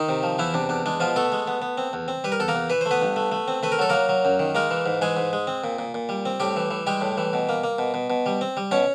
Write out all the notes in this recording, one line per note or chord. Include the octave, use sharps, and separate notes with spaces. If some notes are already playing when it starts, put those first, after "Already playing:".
Already playing: D#3 D#4
C3
F3
E2 E3 E4
C3 D4
E2 D4
G#3 D4
B2 F3 F4
A3 B3 A4
G#3
B3
B3
C4
E2
C4
G3 B4
A#4
E2 A4
A#3 A#4
E2
E3 B4
A3 C5
B3 B4
G2
A3
A3
C4
A3 B4
A#4
F#3 A4
F#3 A#3 A#4
F#3
F#2
D#3
G#3 A#3 A#4
E3
G#2
E3 G#3 G#4
G#2
G#3
C4
A#2
A#2
A#2
G3
C4
A2 G3 G4
E3
E3
G3 G#3 G4
A2
E3
B2
A#3
A#3
B2
B2
B2
G3
C4
G3
B2 C#4 C#5